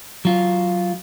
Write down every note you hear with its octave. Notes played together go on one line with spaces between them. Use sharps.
F#3 F4